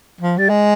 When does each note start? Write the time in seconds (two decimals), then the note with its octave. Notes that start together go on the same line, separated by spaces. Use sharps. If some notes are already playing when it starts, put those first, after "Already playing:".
0.21 F3
0.38 G3
0.49 G#3